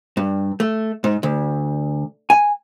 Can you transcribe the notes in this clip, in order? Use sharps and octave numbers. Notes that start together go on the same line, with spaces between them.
G2
A3
G#2
D2
G#5